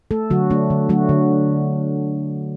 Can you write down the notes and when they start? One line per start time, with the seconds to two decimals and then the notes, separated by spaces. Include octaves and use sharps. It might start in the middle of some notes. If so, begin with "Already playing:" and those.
0.11 A3 A4
0.30 D3 F#3 F#4
0.50 A3 D4
0.70 D3
0.89 F#3 A3 F#4
1.09 D3